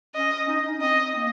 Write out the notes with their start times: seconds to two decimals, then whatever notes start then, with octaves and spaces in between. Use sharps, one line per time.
0.15 C#4 D#5
0.48 D#4
0.59 C#4
0.69 D#4
0.81 C4 D#5
1.16 A#3